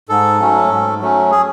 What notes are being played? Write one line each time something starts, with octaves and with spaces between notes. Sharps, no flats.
G#2 A4
F#3 A3 C#4
G#2
F#3 A3 C#4
G#4